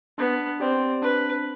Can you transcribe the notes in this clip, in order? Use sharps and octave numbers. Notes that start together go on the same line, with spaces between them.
B3 D4
C4 G4 D5 G5
D4 B4